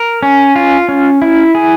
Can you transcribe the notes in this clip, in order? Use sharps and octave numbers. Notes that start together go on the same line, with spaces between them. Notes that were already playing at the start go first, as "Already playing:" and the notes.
Already playing: A#4
C#4
F4
C#4
E4
G#4